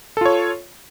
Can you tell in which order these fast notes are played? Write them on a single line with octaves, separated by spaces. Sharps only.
A4 F4 C#5